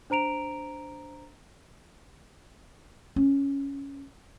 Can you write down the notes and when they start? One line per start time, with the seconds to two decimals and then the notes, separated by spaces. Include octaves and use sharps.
0.10 D4 C5 A#5 D7 F7
3.16 C#4